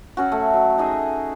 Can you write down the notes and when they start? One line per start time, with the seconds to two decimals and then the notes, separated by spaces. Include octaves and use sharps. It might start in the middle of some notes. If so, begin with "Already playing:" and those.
0.17 F#3 C#4 F#4
0.32 A3
0.54 F#3
0.78 D#4 G#4 D#5 E5